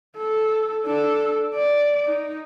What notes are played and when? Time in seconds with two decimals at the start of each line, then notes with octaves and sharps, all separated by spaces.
0.17 A4
0.85 D4 A4
1.55 D5
2.06 D#4